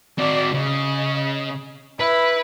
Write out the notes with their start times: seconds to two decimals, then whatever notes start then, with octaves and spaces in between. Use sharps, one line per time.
0.18 C4 F#4 D5
0.54 C#3 D#5
2.00 E4 B4